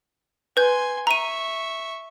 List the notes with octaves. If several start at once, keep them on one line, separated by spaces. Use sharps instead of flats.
B4 G#5 C6 G6
E5 A#5 C#6 D#7